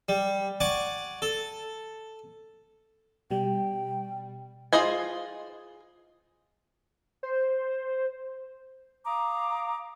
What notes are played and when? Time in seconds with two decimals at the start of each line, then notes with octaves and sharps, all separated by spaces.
0.09 G3
0.60 D5 F#5 G#5 C#6 D6
1.22 A4
3.31 B2 G3 G5
4.73 F4 G#4 C5 D#5 G#5
7.23 C5
9.05 F5 A#5 D6 D#6